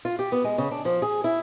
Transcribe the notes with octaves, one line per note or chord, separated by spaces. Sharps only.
F4
G4
B3
G#3
C#3
D4
F3
G#4
E4